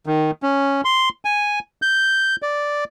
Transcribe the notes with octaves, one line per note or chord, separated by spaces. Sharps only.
D#3
C#4
C6
G#5
G6
D5